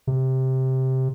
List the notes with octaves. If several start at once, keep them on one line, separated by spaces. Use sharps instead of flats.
C3